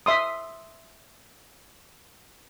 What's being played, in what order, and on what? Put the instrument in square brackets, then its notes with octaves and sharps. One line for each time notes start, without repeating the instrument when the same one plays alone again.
[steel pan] E5 C6 D#6